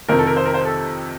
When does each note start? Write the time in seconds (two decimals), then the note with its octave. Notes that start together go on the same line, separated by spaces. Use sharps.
0.08 F2 C3 D#3 A#4
0.18 A4
0.27 A#4
0.36 C5
0.45 A#4
0.54 C5
0.65 A4